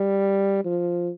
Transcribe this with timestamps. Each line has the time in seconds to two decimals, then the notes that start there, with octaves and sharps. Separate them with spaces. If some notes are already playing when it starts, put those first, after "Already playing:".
Already playing: G3
0.65 F3